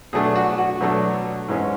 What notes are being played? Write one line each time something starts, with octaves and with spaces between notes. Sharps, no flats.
B2 F#3 A3 D4 G#4
F#4
F#4
B2 F#3 A3 D4
G#2 E3 G#3 C#4